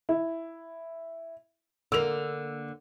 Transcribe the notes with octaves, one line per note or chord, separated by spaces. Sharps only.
E4
D3 A#3 E6 F7